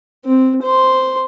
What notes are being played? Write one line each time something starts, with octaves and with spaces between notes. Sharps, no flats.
C4
C5 C6